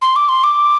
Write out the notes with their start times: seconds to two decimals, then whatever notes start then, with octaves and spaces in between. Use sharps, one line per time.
0.01 C6
0.16 D6
0.28 C6
0.43 D6